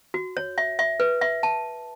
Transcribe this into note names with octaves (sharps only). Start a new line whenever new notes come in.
F#4
C#5
E5
E5
B4
E5
A5